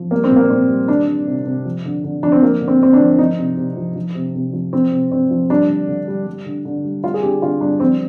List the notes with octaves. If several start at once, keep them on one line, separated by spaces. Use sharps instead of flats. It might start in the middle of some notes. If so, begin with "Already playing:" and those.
Already playing: F3
G3 A#3
C4
A#2
A#3
A#2 C4
G3
D#3 D4
G3
C3
C3
F3
D3
D3
F3 D4
C4
F3 A#3
D3
C4
D3 C4
D4
F3
F3 D#4
C3
C3
F3
F3
C3
C3
F3
F3 C4
C3
C3 C4
F3
G3 D4
D3
D3
G3
G3
D3
D3
G3
G3 F4
G#4
D3 G4
D3 F4
G3 D4
F3 C4